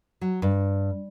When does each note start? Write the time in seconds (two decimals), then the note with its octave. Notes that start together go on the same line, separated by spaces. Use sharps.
0.21 F#3
0.42 G2